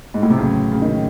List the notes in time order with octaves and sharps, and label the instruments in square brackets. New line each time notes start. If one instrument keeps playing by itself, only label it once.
[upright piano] G#2
A2
C3
[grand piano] A1 A2 F#3 [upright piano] C#3
[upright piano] C#3
D#3